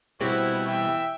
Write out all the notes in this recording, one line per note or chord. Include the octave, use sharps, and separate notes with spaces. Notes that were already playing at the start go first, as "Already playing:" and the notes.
B2 G3 C4 E4 F#4 G4
E3 E5 G5